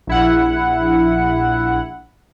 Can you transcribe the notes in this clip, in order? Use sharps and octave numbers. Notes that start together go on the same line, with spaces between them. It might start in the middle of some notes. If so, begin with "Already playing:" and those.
A#1 E4 F#5